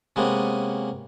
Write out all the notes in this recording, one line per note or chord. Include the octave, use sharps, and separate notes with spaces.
C3 G#3 A#3 B3 C#4